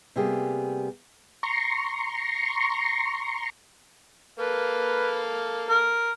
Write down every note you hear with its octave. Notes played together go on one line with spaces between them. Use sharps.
C3 G3 A#3 B3 G4 G#4
A#5 C6 C#6
A#3 A4 B4 F5
A#4